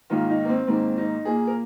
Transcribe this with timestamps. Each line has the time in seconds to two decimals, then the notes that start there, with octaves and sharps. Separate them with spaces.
0.10 G#2 D#3 A#3 F4
0.29 D#4
0.45 A#3
0.49 C4
0.67 G#2 D#3 A#3 C4
0.97 D#4
1.25 A#2 A#3 G#4
1.47 A#4